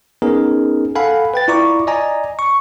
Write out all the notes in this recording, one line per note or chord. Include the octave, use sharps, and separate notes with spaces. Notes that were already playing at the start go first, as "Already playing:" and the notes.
B3 C#4 D#4 G#4 A#4
A4 F5 F#5 G#5 B5
B4 G5 A6
E4 F4 D5 A#5 C#6 D6
D5 D#5 G#5 A#5
C#6